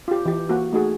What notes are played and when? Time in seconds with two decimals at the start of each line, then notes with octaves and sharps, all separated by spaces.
0.08 F4 G4
0.25 E3 G4
0.49 A#3 F#4
0.72 A3 D#4 F#4 G#4